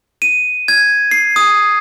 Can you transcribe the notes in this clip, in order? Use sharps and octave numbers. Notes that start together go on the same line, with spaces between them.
D#7
G#6
C7
D#6